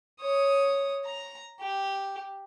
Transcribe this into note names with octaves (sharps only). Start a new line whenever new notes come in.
C#5 D#6
A#5
G4